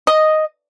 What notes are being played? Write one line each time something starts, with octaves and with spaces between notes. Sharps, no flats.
D#5